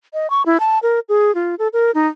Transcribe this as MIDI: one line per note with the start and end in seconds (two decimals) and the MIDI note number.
0.14 0.30 75
0.30 0.42 85
0.46 0.57 64
0.60 0.79 81
0.83 0.99 70
1.09 1.34 68
1.35 1.55 65
1.59 1.68 69
1.73 1.91 70
1.95 2.07 63